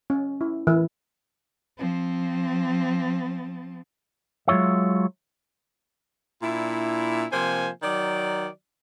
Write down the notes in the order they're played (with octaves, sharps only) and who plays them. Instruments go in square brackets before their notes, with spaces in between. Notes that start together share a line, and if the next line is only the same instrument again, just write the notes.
[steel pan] C#4
E4
E3
[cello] F3 C4
[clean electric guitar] F#3 G#3 F4 C#5 E5
[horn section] A#2 D4 E4
C3 F3 A#3 C5 G#5
D#3 F#3 D5